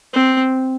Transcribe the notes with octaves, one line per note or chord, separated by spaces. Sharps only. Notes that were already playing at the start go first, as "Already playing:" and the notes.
C4